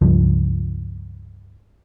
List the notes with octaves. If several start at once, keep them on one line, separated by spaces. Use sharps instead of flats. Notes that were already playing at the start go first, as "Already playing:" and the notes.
C#2 G2 F3